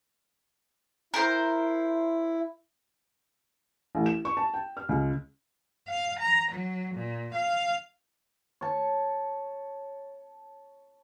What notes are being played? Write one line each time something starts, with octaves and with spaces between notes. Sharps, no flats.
E4 A#4 C5
A1
E7
C#6
A5
G5
F6
C#2
F5
A#5
F#3
A#2
F5
C#5 A5